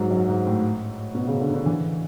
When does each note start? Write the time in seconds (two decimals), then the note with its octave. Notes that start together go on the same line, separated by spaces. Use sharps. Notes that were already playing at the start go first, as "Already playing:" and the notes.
Already playing: G#2 F#3
0.11 F#2
0.29 G#2
0.46 A2
1.15 B2
1.28 C#3
1.40 D3
1.54 D3
1.66 E3